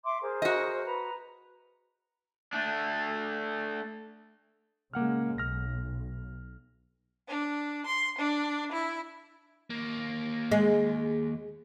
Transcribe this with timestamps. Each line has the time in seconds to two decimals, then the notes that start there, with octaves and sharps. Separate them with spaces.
0.03 E5 C6 D6
0.20 G#4 A#4 C5
0.42 F#4 D#5
0.85 B4 A#5
2.53 A3 D4
4.93 C#3 G#3 A#3 F#5 F6
5.38 B1 F6 A#6
7.28 D4
7.87 C6
8.19 D4
8.73 E4
9.70 D#2 A#3
10.51 G#3